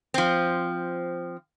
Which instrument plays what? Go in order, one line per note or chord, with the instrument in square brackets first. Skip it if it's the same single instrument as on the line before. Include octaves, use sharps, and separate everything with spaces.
[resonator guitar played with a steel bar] F3 C4